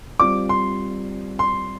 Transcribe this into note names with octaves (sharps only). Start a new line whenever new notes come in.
G3 C4 F4 D5 D6
C6
C6